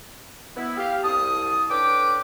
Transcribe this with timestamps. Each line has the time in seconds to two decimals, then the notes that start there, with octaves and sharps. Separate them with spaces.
0.56 B3 E4
0.77 G4 F5
1.03 C2 A5 D#6
1.70 D3 C#4 B4 G5 D6